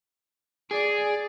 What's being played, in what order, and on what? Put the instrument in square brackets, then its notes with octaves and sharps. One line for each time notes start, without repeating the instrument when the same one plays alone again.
[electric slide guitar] G#4 [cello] D5